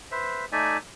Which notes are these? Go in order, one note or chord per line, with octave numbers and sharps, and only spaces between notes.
B4 C5 E5
A3 D#4 D5 E5 G#5